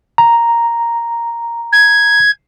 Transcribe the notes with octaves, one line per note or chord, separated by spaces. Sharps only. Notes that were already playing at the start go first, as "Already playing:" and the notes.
A#5
G#6